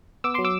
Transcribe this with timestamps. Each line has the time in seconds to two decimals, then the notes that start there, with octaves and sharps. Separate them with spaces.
0.24 B3 D6 E6
0.34 F#3 C6 D6
0.45 D6 E6